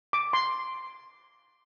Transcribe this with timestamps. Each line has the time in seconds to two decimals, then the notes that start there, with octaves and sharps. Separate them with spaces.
0.13 D6
0.33 C6